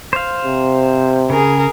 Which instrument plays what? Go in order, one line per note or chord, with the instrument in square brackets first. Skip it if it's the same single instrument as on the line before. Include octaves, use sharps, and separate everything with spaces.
[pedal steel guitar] C5 F5
[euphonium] C3
[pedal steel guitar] C#3 [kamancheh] G#4 A#4